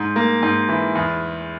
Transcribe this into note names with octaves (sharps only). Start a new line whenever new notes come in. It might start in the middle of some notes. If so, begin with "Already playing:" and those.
Already playing: G#2
A#3
G#2
E3
E2